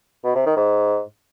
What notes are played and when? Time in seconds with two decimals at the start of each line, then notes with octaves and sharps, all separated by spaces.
0.24 B2
0.35 C3
0.46 D#3
0.57 G#2